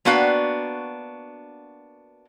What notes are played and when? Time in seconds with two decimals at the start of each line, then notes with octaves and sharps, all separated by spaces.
0.05 A#3 B3 D4 F#4 F5 G5